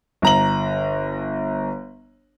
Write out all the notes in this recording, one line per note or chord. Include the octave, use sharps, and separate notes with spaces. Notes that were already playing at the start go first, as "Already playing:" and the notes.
G1 A#5 F#7